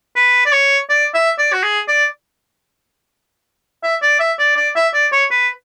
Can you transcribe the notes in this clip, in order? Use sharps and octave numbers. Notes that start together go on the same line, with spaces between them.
B4
D5
C#5
D5
E5
D5
F#4
G#4
D5
E5
D5
E5
D5
D5
E5
D5
C#5
B4